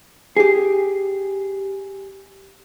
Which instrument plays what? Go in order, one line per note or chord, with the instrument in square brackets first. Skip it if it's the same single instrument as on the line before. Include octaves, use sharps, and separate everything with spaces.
[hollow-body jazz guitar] G4 G#4